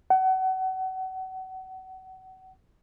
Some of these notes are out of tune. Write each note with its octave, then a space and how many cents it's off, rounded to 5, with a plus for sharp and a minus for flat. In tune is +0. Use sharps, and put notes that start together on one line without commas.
F#5 +30